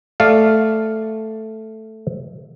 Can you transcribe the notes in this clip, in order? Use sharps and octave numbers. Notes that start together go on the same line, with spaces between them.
A3 D5 F5